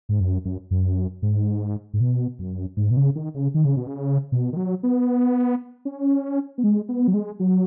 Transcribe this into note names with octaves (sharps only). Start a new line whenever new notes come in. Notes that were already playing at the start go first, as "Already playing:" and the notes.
G#2
F#2
F#2
F#2
G#2
G#2
B2
F#2
G#2
B2
C#3
D#3
C#3
D#3
C#3
B2
C#3
B2
D#3
F#3
B3
C#4
B3
G#3
B3
F#3
G#3
F#3